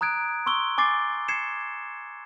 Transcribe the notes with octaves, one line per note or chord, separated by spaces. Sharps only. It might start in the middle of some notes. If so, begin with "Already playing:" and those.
A#5 D#6 F#6 G#6 D7
C6 C#6 E6 G7
G#5 D6 A6 C7
G#6 C7 C#7 E7